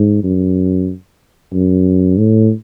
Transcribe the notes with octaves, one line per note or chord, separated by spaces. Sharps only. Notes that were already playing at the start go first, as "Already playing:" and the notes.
Already playing: G#2
F#2
F#2
A2